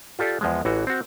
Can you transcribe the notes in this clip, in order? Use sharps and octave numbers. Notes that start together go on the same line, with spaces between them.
F4 G4 A4 D5
E2 F3 G#3
A1 E3 F#4
C4 F#4